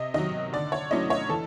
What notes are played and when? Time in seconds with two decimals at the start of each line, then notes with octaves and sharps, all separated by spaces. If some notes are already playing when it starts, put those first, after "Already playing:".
Already playing: C3 D#5
0.14 D#3 F#3 D#5
0.53 D3 D5
0.72 C#5
0.91 F#3 A3 C#4 E4 D#5
1.10 C#5
1.29 E3 A4